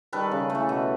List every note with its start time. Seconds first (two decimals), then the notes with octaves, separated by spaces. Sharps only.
0.13 D#3 G3 A4 B4
0.32 C#3
0.50 A3
0.55 E3
0.69 B2